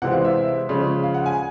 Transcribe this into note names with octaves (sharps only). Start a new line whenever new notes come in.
C3 E3 G#3 C4 F#5
F5
E5
C#3 F3 G#3 C#4
F5
F#5
G#5